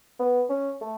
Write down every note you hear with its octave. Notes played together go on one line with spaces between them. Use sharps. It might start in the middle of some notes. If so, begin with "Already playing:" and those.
B3
C#4
A3